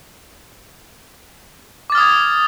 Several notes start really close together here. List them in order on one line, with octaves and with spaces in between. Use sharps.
D6 A6 F6 D#6 G#6